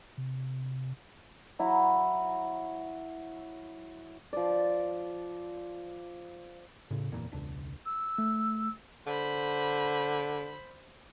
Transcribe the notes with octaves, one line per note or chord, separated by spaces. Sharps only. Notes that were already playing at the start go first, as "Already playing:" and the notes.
C3
F#3 E4 F#4 A#5
F3 D5
A2 C#3
F#1 E2 A#2
E1 C#2 D4
E6
A3
D3 C5 B5